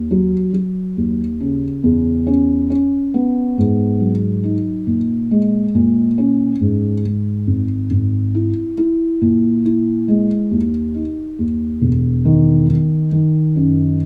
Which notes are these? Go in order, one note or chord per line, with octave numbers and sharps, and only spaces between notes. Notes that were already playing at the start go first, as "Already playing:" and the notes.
Already playing: D#2
F#3
F#3
D#2
C#3
E2
C#4
C#4
B3
G#2
F#3
D#4
A#2
G#3
A#2
C#4
G#2
G#2
G#1
G#1
E4
E4
A#2
E4
G#3
D#2
D#4
D#2
E1
D#3
D#3
D#3
F#2